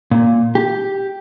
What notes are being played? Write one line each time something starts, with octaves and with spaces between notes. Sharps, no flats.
A#2
G4